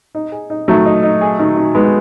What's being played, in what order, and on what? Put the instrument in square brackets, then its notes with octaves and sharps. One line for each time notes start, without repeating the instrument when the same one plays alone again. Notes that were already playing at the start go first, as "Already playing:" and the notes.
[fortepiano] D#4
G#4
D#4
[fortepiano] D#3 [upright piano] F#3 A3
[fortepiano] D#4
D#4
G#4
D#3
D#3
[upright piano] G#3 B3 [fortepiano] D#4